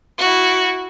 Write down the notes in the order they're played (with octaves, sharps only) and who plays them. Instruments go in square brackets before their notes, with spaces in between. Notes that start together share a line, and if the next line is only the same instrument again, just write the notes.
[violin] E4 F#4